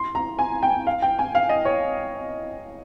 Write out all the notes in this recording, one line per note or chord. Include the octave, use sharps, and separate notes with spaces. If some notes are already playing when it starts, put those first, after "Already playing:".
Already playing: C6
A#5
G#5
G5
F5
G5
G#5
F5
D#5
C#5